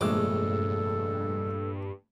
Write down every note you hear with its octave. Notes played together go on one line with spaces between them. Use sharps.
F1 A#1 G2 G#3 A3 A4 D6 E6